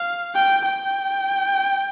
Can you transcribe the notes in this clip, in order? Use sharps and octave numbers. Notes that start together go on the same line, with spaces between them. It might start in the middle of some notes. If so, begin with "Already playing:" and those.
Already playing: F5
G5
G5